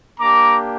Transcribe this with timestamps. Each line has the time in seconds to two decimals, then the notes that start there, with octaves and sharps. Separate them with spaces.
0.20 A#3 D4 G4 A#5 D6